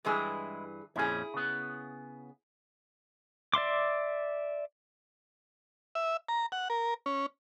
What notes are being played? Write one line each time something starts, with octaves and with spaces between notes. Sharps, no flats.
G2 E3 G#3 E4 G#4
F2 A#2 C#4 E4 G#4
C#3 B3
D5 E5 C6 D6
E5
A#5
F#5
A#4
C#4